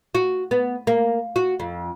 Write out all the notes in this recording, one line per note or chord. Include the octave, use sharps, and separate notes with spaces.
F#4
B3
A#3
F#4
F2